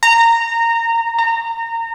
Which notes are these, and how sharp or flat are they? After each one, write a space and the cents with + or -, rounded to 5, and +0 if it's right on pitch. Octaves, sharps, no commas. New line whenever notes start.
A#5 -20
A#5 -25